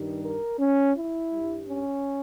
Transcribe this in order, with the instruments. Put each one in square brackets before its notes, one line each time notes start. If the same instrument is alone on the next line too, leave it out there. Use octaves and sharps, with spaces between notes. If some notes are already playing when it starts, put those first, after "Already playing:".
Already playing: [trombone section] G2 D#3 G3
A#4
C#4
E4
G2 G3
C#4